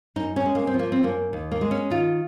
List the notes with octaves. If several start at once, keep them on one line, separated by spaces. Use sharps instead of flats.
F#2 D#4
C#4
G#3
A#3
C4
F3
A#3
C4
F#2 A#3
D#2
A#3
G#3
C#4
D#3 F4